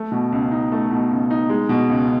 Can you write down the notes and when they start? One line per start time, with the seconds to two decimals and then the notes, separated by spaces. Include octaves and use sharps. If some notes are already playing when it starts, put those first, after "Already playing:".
Already playing: A3
0.12 B2
0.32 C#2
0.51 D#4
0.72 A3
0.91 B2
1.11 C#2
1.30 D#4
1.49 G#3
1.69 B2
1.90 C#2